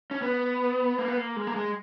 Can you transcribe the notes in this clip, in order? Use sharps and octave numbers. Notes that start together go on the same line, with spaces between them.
C#4
B3
A#3
B3
A#3
G#3
A#3
G#3